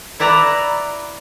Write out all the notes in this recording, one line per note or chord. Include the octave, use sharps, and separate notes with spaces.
E4 B4 D5 A#5